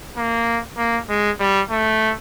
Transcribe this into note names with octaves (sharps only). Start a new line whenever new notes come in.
A#3
A#3
G#3
G3
A3